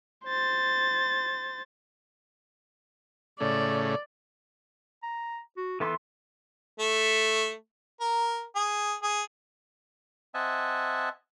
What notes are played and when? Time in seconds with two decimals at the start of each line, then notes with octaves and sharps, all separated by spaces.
0.25 C5 A6
3.40 A2 C#3 D5
5.03 A#5
5.57 F#4
5.80 E3 B3 A4 C6
6.79 A3
8.01 A#4
8.56 G#4
9.03 G#4
10.34 C4 D#5 E5 F#5 G#5 A5